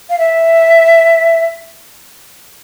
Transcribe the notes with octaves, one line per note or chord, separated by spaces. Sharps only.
F5
E5